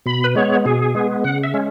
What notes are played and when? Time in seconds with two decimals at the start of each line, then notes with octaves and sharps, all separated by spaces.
0.06 B2 B5
0.24 B4
0.36 G#3 B3 C#5
0.65 B2 G#4
0.95 G#3 B3
1.24 C#3 F#5
1.44 E5
1.54 G#3 C#4